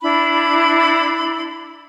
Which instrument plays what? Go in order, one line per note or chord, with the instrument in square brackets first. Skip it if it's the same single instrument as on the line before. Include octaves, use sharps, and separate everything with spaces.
[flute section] D4 E4 B5